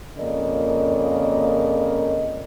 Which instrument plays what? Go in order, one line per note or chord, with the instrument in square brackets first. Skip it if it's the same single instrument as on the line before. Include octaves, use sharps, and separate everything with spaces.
[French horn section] F2 C#3 A#3 A#4 D5 D#5